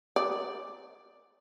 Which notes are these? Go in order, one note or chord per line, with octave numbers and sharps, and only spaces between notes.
D5